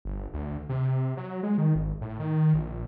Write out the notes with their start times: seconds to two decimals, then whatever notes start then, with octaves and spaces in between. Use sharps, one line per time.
0.05 G1
0.34 D2
0.69 C3
1.17 F#3
1.43 G#3
1.58 D#3
1.75 G#1
2.01 A2
2.20 D#3
2.54 A#1